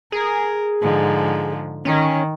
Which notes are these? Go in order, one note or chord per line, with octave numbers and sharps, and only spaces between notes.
G#4 A#4
G#2 D3 F3
D#3 C#4